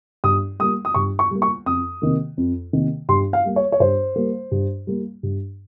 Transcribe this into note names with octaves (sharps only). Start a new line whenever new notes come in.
G2 D#6
G3 A#3 D#6
D#6
G2 C#6
C#6
G3 A#3
C#6
F2 D#6
C3 D#3 A#3
F2
C3 D#3 A#3
G2 C6
F5
G3 A#3
C#5
C#5
G2 C5
G3 A#3
G2
G3 A#3
G2